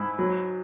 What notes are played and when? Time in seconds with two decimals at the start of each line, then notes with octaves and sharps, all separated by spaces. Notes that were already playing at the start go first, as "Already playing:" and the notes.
Already playing: G#2 E4
0.19 F#3